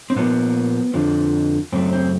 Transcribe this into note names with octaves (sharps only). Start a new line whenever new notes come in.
C4
A#2 F3 A#3 B3
F2 D3 F3
F#2 C#3 F#3 A3 C4
C4